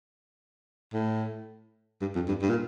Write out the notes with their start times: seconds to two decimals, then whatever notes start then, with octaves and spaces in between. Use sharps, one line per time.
0.93 A2
2.01 G2
2.15 F2
2.28 G2
2.42 G2
2.49 A#2